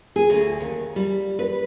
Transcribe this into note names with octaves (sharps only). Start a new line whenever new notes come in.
G#4
D2
D#2
G3
B4